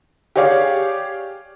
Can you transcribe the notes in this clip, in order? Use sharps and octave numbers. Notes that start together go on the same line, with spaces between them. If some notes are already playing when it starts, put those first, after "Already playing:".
G4 G#4 C#5 D5 F5